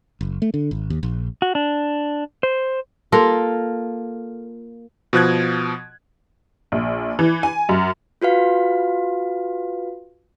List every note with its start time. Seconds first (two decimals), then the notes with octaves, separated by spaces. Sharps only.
0.21 F#1
0.42 A3
0.54 D3
0.71 G#1
0.90 D#2
1.03 A#1
1.42 F#4
1.55 D4
2.43 C5
3.12 A#3 F4 A4 A#4
5.13 B2 F3 F#6 G#6
6.72 A#1
7.19 E3
7.43 G#5
7.69 F#2
8.22 F4 F#4 B4 F5